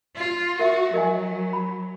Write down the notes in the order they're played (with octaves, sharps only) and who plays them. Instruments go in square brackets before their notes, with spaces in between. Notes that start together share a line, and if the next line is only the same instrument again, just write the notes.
[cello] F4
[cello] F#4 [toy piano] A#4 E5
[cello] F#3 [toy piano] A#4 D#5 G#5
[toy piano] B5